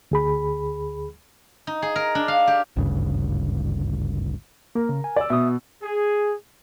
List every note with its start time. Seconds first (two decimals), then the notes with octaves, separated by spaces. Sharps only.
0.11 D2 G#4 B5
1.67 D#4
1.82 G#4
1.96 A#4
2.15 D4
2.28 F5
2.48 G4
2.76 G#1 D2 G2 C#3
4.75 A#3 A#4
4.89 C#3
5.04 G#5
5.16 D5 E6
5.30 B2 E5 D#6
5.83 G#4